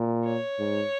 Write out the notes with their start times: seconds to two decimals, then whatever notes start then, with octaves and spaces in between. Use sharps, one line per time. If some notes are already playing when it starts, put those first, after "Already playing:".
Already playing: A#2
0.25 C#5
0.59 G#2